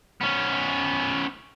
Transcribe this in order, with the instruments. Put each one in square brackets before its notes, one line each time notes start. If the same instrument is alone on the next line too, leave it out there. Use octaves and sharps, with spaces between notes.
[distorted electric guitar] B3 C#4